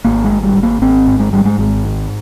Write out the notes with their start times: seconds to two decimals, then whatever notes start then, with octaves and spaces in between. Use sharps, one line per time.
0.05 G#1 A#3
0.24 G#3
0.31 G#2
0.43 G3
0.56 G#1
0.63 A#3
0.81 G#1 C4
1.07 G#2
1.20 G#3
1.33 G#2 G3
1.45 G#3
1.58 G#1 G#3
1.84 G#2